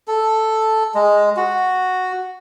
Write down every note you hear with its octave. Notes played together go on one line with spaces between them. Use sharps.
A4
G#3
F#4